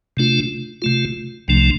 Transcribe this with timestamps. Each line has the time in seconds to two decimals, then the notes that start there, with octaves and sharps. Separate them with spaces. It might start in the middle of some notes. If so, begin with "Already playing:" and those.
0.17 C3 A3 D4 F4
0.82 C3 A3 F4
1.48 C2 C3 F3 A3 D4